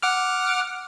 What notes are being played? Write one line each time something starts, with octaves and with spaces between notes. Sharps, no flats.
F#5 D6 F6